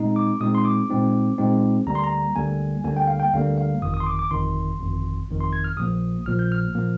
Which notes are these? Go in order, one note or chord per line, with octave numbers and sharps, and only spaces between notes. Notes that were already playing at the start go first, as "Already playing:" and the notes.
Already playing: A#2 G#3 C4 D#4
D6
A#2 G#3 C4 D#4 D#6
C6
D6
A#2 G#3 C4 D#4
A#2 G#3 C4 D#4
D2 D3 G3 A#3 A#5
C6
A#5
D2 D3 G3 A#3 G#5
D2 D3 G3 A#3 G#5
G5
F5
G5
D2 D3 G3 A#3 F5
F5
G1 F2 D#3 D#6
D#6
C6
D6
D6
G1 F2 D#3 C6
G1 F2 D#3
G1 F2 D#3
C6
G#6
F6
A#1 A#2 F3 A#3 D#6
A#1 A#2 F3 A#3 F6
G6
F6
A#2 F3 A#3